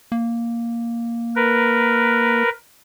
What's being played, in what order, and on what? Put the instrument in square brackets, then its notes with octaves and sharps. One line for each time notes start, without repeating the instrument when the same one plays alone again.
[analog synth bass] A#3
[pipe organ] A#4 B4